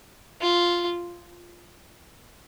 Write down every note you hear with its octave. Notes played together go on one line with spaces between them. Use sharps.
F4